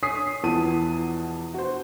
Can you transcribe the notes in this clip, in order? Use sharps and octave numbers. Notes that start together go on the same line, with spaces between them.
C#5 G#5 D#6 B6 C7
E2 B2 E3 F3 A5 D#7
F#4 C5